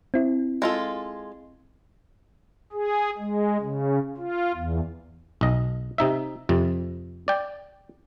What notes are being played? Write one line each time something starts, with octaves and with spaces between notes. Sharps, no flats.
C4 E4
G#3 F4 A4
G#4
G#3
C#3
F4
E2
B1 D#5
C3 D#4 E5
F2 C3
D5 G5